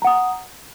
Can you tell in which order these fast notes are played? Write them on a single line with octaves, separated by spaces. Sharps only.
A#5 F#5 D#6